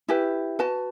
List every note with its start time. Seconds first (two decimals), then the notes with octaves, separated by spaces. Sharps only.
0.08 E4 G4 B4
0.59 F#4 B4 A5